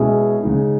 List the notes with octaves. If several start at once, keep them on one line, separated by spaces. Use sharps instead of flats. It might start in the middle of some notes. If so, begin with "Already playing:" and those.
Already playing: B2 G#3 C#4 E4 G#4
C#3 G#3 D#4